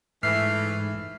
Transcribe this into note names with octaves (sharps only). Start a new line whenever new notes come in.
G#2 E3 A3 F6 C7